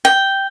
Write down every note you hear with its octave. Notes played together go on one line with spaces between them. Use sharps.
G5